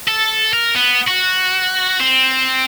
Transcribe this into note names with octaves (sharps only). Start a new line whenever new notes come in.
A4
A#4
B3
F#4
C4